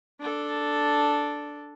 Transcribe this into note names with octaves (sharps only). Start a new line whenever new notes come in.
D4 A4